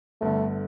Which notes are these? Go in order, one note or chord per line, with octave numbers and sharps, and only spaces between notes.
G1 G2 D3 A3